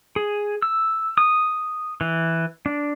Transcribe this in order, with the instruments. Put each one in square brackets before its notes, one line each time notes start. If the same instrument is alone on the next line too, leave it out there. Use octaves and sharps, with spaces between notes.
[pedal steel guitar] G#4
E6
D#6
E3
D4